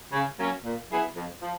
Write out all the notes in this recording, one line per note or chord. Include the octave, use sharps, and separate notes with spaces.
C#3
F#3 A#3 C#4
A#2
F#3 B3 E4 G#4
F2
F3